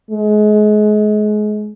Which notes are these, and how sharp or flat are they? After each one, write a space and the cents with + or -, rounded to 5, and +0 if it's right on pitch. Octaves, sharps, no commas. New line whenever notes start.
G#3 +30